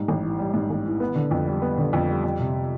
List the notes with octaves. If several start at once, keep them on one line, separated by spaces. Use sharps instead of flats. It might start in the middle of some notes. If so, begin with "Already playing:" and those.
Already playing: G#2 G3
A1
E3
G3
G#2
A1
E3
B3
D3
F2
G3
B3
D3
F2
G3
F2
C3